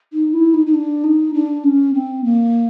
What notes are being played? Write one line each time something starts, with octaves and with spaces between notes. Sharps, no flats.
D#4
E4
D#4
D#4
D4
D#4
D4
C#4
C4
A#3